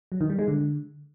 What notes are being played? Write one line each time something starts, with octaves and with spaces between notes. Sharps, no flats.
F#3
D#3
G3
G#3
D3